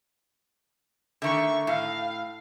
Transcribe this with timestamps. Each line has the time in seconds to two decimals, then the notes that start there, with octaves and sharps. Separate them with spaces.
1.22 D3 D#3 A3 E5 C#6
1.67 A2 F5